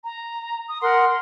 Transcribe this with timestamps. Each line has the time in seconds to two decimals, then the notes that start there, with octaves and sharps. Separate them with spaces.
0.04 A#5
0.69 D#6
0.82 A#4 F#5 C6